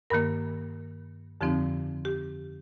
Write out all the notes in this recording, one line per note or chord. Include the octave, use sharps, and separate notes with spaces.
G2 D#3 A#3 A#4
F2 D3 F3 C4 D#4 G4
G4